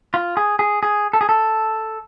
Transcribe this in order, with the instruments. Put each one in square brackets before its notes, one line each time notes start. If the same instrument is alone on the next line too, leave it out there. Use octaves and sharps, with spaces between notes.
[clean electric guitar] F4
G#4
G#4
G#4
A4
G#4
A4